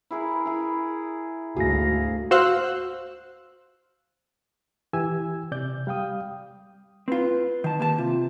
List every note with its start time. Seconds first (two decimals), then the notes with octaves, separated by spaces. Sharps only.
0.11 E4 G#4 A#4
0.45 E4 G#4
1.57 D2 G#2 F#4 G#4 F5 A#6
2.31 F#4 C5 F5 E6 F#6
4.93 E3 G4 G#5 E6
5.52 C3 D5 G6
5.87 G3 F5 G5 D#6
7.08 C4 F4 B4
7.64 D#3 A5
7.79 A#3 G4 A5
7.98 C3 F4